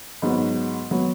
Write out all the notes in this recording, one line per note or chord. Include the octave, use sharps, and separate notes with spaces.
G#2 F#3 B3
F#3 B3